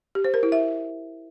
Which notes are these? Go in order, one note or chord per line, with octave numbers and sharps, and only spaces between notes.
G4
C5
A#4
E4
E5